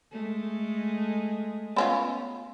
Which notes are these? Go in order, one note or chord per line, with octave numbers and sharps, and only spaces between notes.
G#3 A3
B3 C#4 F4